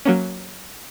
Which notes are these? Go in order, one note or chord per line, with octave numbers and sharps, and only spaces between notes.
F#3 A#3 C#4